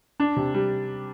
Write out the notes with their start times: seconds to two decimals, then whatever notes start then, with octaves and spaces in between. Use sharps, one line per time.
0.20 D4
0.36 C3
0.54 G3